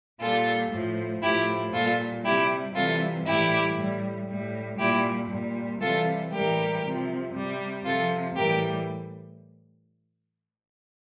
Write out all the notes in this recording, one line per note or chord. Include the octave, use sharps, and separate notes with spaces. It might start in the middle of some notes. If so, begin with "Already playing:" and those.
A#2 G3 F4 A4
A2 F3
A2 F3 E4 G4
A#2 G3 F4 A4
C3 G3 E4 G4
C3 E3 G3 F4 A4
A2 E3 G3 E4 G4
A2 G3
A2 G3
A#2 G3 E4 G4
A#2 G3
C3 E3 G3 F4 A4
A2 E3 G3 G4 A#4
C3 F3
C3 G3
C3 F3 F4 A4
A2 E3 G3 G4 A#4